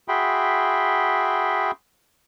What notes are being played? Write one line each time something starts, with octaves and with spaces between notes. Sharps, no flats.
F#4 G#4 E5 G5 B5 C6